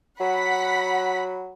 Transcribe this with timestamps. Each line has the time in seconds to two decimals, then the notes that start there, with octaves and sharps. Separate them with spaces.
0.20 F#3 F#5 B5 B6